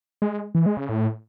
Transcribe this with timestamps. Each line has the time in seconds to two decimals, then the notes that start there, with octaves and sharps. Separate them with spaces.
0.22 G#3
0.55 E3
0.66 G#3
0.77 C#3
0.89 A2